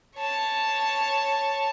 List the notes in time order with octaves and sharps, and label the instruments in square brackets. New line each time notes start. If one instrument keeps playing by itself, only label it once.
[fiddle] C#5 A5